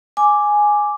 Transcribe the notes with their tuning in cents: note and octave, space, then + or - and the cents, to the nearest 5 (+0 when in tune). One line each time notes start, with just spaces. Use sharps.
G#5 +0 D6 +0